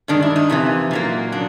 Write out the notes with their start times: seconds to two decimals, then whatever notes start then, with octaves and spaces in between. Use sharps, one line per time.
0.08 G2 D#3 G#3 D4
0.22 E4
0.36 D#4
0.50 F2 C3 E3
0.91 A#2 F#3 A#3
1.32 C#3 F#3 D4